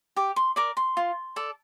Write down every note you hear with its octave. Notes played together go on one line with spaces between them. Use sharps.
G4 D6
C6
A#4 D5 D6
C6
F4
A4 D5